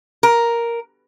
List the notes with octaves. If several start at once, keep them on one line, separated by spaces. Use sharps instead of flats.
A#4